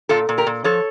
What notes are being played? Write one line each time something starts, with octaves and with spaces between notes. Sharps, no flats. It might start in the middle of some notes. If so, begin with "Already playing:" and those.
A#2 F4 A4
A#2
G4 A#4
A#2
F3 A4 C#5